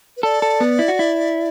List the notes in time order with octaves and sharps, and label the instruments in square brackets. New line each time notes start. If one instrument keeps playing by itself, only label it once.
[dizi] B4
[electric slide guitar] A4 [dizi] D5
[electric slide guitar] A4
B3
E4
F#4
E4